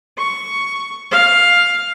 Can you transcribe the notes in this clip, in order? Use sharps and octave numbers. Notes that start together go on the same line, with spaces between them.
C#6
F5